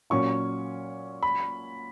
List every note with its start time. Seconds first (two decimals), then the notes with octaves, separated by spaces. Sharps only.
0.10 A#2 F#3 C#4 C#6
1.23 B5